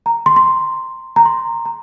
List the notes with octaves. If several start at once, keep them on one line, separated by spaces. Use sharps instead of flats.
A#5
C6
C6
A#5
C6
A#5